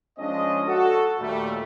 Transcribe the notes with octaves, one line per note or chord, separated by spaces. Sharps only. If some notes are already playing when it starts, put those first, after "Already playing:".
F3 G#3 C#4 D4 D#5
F#4 A4
D#2 A#2 G3 A3